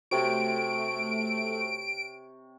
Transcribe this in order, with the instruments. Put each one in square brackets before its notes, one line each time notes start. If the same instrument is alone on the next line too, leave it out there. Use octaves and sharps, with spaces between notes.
[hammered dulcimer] C3 C#5 [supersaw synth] A3 [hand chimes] F#4 C5 G5 [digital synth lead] D7